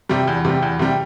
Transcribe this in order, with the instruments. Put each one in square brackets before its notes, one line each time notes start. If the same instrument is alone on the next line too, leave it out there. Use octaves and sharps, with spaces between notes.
[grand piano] C3 G3
E2
C3 G3
E2
C3 G3